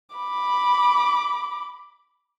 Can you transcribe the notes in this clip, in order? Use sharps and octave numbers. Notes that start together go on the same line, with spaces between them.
B5 D6